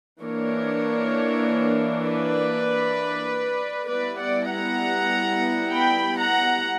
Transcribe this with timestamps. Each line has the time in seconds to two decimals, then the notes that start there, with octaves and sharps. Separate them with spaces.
0.22 E3 A#3 D4 A#4 C#5
2.05 B4 D5
3.89 G3 B3 E4 B4 D5
4.20 D5 F#5
4.50 F#5 A#5
5.73 G5 B5
6.18 F#5 A#5